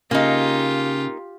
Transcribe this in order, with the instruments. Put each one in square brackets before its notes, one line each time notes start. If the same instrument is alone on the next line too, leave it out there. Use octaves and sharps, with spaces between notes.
[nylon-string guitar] C#3 [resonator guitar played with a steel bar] A#3 D#4 [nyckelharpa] F4 G4